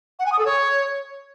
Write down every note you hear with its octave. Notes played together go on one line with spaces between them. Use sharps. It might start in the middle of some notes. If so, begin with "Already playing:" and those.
F#5
G#5
D#6
A4
C#5